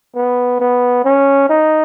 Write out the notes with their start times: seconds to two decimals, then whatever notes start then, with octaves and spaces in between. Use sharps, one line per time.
0.15 B3
0.60 B3
1.05 C#4
1.49 D#4